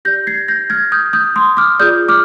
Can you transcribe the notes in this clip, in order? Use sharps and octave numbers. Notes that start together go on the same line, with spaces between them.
G4 D5 G6 A#6
G#6 C7
G6 A#6
F6 G#6
D#6 G6
D#6 G6
C6 D#6
D6 F6
F4 G#4 D5 D#6 G6
D6 F6